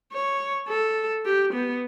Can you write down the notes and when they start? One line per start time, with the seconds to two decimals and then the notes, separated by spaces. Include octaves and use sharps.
0.13 C#5
0.68 A4
1.25 G4
1.54 B3